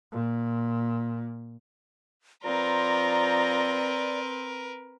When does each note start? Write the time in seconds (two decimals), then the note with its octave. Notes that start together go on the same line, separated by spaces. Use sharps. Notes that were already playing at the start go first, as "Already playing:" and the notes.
0.12 A#2
2.44 F3 C4 A#4 B4 D5 A#5 C6